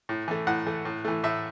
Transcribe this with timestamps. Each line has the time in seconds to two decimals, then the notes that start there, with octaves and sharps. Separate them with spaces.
0.09 A2
0.28 E3 A3
0.47 A2 F#5
0.66 E3 A3
0.85 A2
1.05 E3 A3
1.24 A2 E5